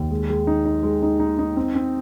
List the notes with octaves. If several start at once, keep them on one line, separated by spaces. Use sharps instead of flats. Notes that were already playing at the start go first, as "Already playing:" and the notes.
Already playing: D#2
G#3
G#3
D#4
D#4
G#3
D#4
D#4
D#4
C4
C4